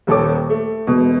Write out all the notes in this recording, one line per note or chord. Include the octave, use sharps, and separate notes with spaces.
D#1 D#2 A4 C#5 D6
A3
E1 B2